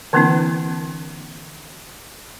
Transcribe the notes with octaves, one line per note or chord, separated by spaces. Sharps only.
D3 E3 A#3 C4 D4 E4